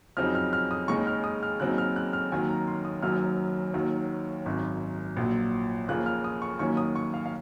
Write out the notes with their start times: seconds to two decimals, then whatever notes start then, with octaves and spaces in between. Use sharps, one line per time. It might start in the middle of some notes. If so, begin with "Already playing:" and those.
0.17 F2 C#3 F#3 C4 D#4 F6
0.35 F6
0.53 F6
0.71 D#6
0.88 D#2 C#3 G#3 D#4 C#6
1.07 F6
1.24 D#6
1.43 F6
1.60 D#2 C#3 F#3 C4 D#4 F#6
1.78 F6
1.96 F#6
2.13 F6
2.32 D#2 D#3 F#3 G#5
2.49 A#5
2.67 C6
2.85 D#6
3.02 F#1 F#2 D#3 F#3 F6
3.74 D#2 D#3 F#3
4.46 G#1 F#2 D#3
5.16 A#1 A#2 F#3
5.88 D#2 C#3 F3 A#3 F4 F#6
6.06 F6
6.24 D#6
6.42 C#6
6.59 D#2 D#3 F#3 A#3 C#4 C#6
6.77 D#6
6.96 C#6
7.14 F5
7.26 F5